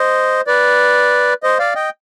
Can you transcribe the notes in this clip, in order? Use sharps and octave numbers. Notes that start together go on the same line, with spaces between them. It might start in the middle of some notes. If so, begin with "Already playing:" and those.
Already playing: C5 D#5
B4 D5
C5 D#5
D5 F5
D#5 G5